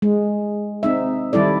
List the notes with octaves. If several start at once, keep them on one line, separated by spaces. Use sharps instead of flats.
G#3
C4 D#4 E5
D#3 G3 E4 A4 D5